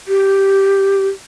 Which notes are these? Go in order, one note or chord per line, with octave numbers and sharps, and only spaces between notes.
G4